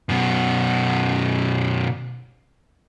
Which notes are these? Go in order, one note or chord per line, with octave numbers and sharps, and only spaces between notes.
F#2 B2